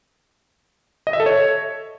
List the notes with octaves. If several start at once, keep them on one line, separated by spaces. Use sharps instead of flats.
D#5
E5
A4
C#5